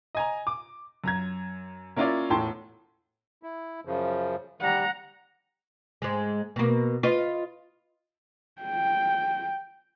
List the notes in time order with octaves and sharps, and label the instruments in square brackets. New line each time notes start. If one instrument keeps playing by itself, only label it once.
[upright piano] D#5 G#5 A#5
D6
F#2 A#5 G#6
A#3 C#4 E4 F4 A#4 D5
E1 A2 G5 A5 C6
[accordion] E4
F#2 C#3 F3
[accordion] G3 [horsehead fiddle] F#5 A#5
[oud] G#2 G#3
B2 A#3
F4 B4 D#5
[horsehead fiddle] G5